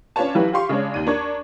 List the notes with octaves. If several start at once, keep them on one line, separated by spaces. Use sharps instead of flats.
C#4 D4 F4 B4 C#5 A5
E3 F#3 E4 F4 G4 B4
F4 G4 F5 C6 C#6
C#3 G#3 C#4 D4 C#5
D#2 D#7
D4 A#4 C#6 G#6